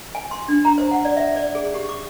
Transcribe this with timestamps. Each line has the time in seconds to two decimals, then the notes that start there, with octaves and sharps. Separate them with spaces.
0.15 G#5
0.31 C6
0.48 D4
0.65 A#5
0.78 C5
0.91 F#5
1.05 D5
1.17 E5
1.36 D5
1.55 G#4
1.74 G4
1.89 D6